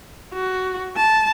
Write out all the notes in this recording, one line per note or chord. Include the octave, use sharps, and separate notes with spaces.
F#4
A5